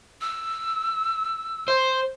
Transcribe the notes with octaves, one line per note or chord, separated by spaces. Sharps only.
E6
C5